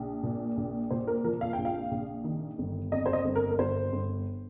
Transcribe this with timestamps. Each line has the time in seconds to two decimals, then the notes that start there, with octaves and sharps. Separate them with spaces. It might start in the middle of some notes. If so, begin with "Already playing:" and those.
Already playing: A#1
0.23 A#2
0.57 A#1
0.91 A#2 C5
1.07 A#4
1.24 F3 A#4
1.41 F5
1.53 A#1 G5
1.65 F5
1.91 A#1
2.24 D#3
2.59 G1
2.92 F2 D#5
3.06 C5
3.13 D#5
3.25 G1
3.35 A#4
3.51 A#4
3.59 G1 C5
3.92 G1